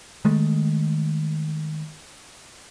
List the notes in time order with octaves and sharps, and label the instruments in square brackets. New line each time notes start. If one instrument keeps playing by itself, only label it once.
[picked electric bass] D#3 G#3 A3